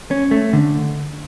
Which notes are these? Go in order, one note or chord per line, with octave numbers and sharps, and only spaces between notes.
C#4
A3
D3